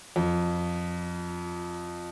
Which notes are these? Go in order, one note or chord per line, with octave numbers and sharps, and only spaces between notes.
F2